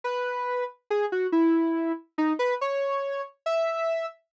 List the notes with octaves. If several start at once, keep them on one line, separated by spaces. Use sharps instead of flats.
B4
G#4
F#4
E4
D#4
B4
C#5
E5